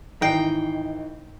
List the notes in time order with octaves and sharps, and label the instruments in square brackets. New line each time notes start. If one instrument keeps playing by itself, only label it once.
[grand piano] G#1 E3 C7 [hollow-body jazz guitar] D#4 [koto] G5